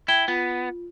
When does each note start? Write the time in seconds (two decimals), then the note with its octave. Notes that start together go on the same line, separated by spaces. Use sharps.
0.08 E4 G5 G#6 G7
0.28 B3 F4